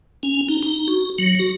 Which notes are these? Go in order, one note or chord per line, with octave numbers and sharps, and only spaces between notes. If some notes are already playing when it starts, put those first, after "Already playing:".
C#4
D#4
D#4
F#4
F#3
F#4